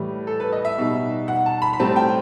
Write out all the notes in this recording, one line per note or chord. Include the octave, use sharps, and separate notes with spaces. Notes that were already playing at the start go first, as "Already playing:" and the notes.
Already playing: A2 E3 G3
A4
B4
D#5
E5
B2 G3 D#4
F#5
A5
B5
B5
A2 G3 C4 A5
G5